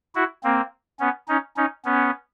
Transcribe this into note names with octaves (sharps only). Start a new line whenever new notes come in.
E4 F#4
A#3 C4
B3 C#4
C#4 D#4
C#4 D#4
B3 C#4